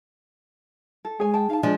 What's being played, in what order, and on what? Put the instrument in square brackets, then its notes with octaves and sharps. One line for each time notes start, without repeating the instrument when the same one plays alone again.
[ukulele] A4
[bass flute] G#3 [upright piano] G#4 [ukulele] C#5 G#5
[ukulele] G5 A5
[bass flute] D#4 [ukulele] F5 A5
[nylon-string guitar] F3 G#3 [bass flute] D4 [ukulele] D5